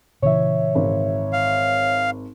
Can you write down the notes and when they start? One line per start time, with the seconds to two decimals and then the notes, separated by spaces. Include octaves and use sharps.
0.22 A#2 C#3 E3 C#5 E5
0.75 G#1
1.33 F5